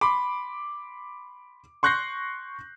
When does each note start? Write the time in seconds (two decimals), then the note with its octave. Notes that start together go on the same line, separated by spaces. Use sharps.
0.01 B5 C6 D6
1.83 C6 C#6 F#6 G6 A#6 C7